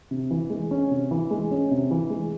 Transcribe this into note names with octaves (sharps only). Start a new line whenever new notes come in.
C3
E3
G#3
C#4
C3
E3
G#3
C#4
C3
E3
G#3